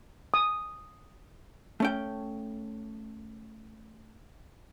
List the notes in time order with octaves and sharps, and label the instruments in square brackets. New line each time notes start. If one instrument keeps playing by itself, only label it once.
[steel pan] D#6
[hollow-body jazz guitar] A3 C#4 G5